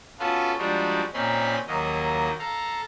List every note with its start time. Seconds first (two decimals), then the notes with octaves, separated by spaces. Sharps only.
0.19 B3 C#4 F4 F#4 A4 F5
0.58 F3 G3 G#3 D4 D#4 F#4
1.14 A#2 C4 C#4 D#4 B5 C6
1.67 D#2 D#3 F#3 A#3 D#5
2.39 A4 F5 A#5